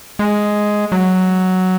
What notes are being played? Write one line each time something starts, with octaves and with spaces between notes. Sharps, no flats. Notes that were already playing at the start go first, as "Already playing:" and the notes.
G#3
F#3